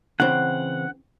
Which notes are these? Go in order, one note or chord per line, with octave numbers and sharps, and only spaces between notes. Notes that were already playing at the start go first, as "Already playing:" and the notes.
C#3 E3 C4 F#5